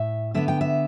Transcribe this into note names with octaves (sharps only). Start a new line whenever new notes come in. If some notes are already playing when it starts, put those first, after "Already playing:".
Already playing: A2 E5
D3 B3 E5
G5
E5